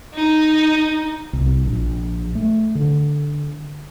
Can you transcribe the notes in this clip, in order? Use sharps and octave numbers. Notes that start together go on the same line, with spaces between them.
D#4
C2
A#1
A3
D3